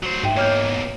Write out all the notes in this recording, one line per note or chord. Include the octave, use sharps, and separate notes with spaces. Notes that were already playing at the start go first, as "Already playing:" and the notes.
F#3 C5
G#2 E5 G5 D#7
B2 A#3 C#5 F6 G6